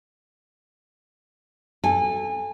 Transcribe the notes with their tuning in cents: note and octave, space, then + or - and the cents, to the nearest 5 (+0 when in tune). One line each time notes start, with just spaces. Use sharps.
A4 -10 G#5 -30